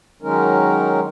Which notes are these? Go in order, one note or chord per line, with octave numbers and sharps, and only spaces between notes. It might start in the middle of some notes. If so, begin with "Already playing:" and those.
D#3 F#3 G#3 C#4 D#4 A#4